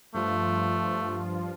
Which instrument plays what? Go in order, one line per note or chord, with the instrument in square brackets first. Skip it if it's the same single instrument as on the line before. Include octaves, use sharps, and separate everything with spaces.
[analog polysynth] G2 F3 F4 [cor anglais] A3